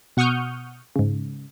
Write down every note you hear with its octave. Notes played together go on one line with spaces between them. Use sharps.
B2 F#5 C#6 D#6 F6 G6
G#2 C#3